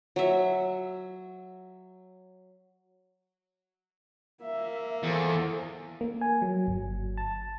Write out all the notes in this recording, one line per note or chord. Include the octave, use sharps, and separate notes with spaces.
F#3 E5
A#3 E5
E2 A4 C5
A#3
G#5
F#3
G1
A5